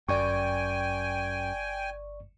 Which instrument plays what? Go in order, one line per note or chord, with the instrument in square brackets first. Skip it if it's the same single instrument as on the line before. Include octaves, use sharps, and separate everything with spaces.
[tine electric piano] G1 D5 C#6 [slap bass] F#2 [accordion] G5 G#5